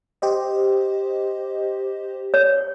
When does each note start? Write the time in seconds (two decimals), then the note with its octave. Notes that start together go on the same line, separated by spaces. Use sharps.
0.22 G4 C5 D#5
2.34 C#5